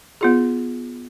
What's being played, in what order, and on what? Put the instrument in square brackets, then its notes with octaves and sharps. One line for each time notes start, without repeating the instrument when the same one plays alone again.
[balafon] B3 F4 G#4